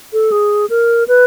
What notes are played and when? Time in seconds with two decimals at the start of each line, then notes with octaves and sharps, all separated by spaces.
0.13 A4
0.32 G#4
0.70 A#4
1.08 B4